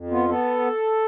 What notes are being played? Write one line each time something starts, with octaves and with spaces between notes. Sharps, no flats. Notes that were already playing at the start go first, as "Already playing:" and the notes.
Already playing: F2
B3 F4
B3 A4